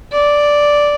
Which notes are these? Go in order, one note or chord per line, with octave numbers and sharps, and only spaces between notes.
D5